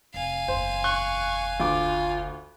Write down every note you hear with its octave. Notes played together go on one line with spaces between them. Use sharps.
F1 F5 G#5
F#1 E2 C5
C#6 F#6
D2 F4 D6